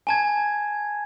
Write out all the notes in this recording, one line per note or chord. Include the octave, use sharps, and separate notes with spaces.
G#5 A5 G#6